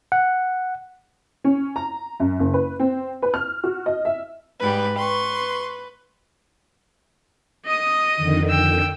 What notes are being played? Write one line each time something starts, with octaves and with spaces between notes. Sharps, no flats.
F#5
C#4
A#5
F#2
F#1
B4
C4
B4
F6
F#4
D#5
E5
G#2 G3 B4
B4 C6 C#6
D#5 D#6
F2 D3 D#3
G5 E6